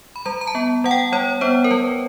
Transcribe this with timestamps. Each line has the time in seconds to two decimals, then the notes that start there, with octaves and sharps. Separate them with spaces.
0.16 B5
0.25 G3 A#5
0.41 A#5
0.47 A5
0.55 B3
0.84 G3 F#5
0.91 G5
1.12 G3 C#5
1.41 B3 C5
1.64 A#4
1.71 G3 B4